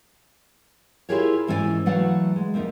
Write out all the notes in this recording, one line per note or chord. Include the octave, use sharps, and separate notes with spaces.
E4 F4 G4 G#4 A#4 C#5
G#2 E3 C#4 A#4 D5 G#5
E3 F#3 A3 D5 F5 F#5
G#3
F2 C3 A#3 D#4